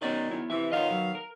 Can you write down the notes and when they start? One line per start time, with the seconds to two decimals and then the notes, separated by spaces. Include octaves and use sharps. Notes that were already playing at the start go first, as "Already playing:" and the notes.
0.02 D#3 F#3 B3 C#4 D5 D#5
0.31 B3 E4
0.50 C3 E3 E5
0.72 D#3 B3 F4 C#5 D#5 F5
0.90 F#3
1.15 A#4